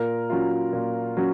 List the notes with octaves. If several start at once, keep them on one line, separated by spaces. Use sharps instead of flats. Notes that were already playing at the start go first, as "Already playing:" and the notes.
Already playing: A#2 A#4
F#3 C#4 F4
A#2
F#3 C#4